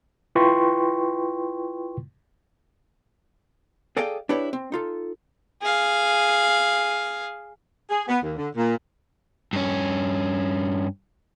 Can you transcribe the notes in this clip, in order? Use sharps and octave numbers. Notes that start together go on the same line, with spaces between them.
E4 F4 B4 G5 C6 C#6
G#4 A4 D5 D#5 F5 G5
D4 E4 G4 B4 C#5
C4
D#4 F4 A4
G#4 F5
G#4
B3
D#2
D3
A#2
G2 C#4